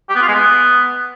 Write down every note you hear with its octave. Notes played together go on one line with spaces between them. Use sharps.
G4
B3
F4
G#3
B3